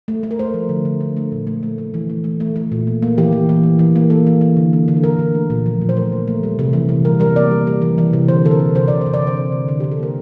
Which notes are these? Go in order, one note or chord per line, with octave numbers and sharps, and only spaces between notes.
A3
A3
A#4
A3 C5
F3
D3
D3
D3
A3
A#2
A3
A3
A3
E3
A3
A3
A3
A3
A#2
A#3
A#3
E3 G4
E3
E3
E3
E3
A#3
A#3 A4
E3
E3
D3
A#3
D3
A4
D3 A#4
D3
A3
A#2
F3
A#2
C5
A3 A#4
A3
A3
G3
C3
E3
C3
G3 A#4
G3 A#4
A#3 D5
G3
G3
E3
E3
C3
D3 C5
D3 A4
A#4
D3
C3 C5
C3 D5
C3 C5
D5
D3
C5
D3
D3
D3
G4
D3
A4
A#3 A#4